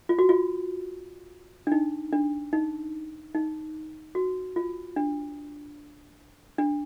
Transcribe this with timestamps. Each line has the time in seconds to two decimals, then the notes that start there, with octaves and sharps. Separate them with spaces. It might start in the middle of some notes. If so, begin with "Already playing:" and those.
0.09 F4
0.19 F#4
0.29 F4
1.67 D4
1.72 D#4
2.12 D4
2.53 D#4
3.35 D#4
4.15 F#4
4.56 F4
4.96 D4
6.58 D4